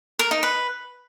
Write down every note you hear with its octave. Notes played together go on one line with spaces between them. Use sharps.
A#4
D#4
B4